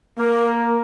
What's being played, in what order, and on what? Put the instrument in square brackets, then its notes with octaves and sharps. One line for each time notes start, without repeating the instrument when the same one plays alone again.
[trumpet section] A#3 [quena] A#4